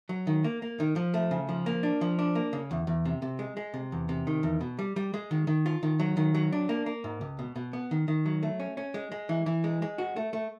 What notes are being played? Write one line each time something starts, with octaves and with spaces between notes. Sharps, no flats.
F#3
D#3
A#3
A#3
D#3
F3
A3
C#3
F3
A#3
D4
F3
D4
A#3
C#3
E2
E2
C3
C3
G#3
G#3
C3
E2
C3
D#3
E2
B2
G3
G3
G#3
D#3
D#3
F4
D#3
F#3
D#3
F#3
D4
A#3
A#3
G#2
C#2
B2
B2
B3
D#3
D#3
F#3
A3
C#4
C#4
G#3
G#3
E3
E3
G#3
G#3
F#4
A3
A3